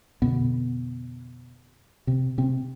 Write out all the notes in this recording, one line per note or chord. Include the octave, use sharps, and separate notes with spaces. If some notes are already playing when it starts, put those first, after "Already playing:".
F2 B2 D3 B3
C3 C4
C3 C4